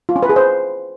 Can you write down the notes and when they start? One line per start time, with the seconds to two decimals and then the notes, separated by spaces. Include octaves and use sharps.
0.09 F4
0.16 C#4
0.23 B4
0.29 G#4
0.36 C5